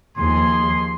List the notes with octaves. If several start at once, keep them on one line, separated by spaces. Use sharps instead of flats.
D#2 F3 G#4 C6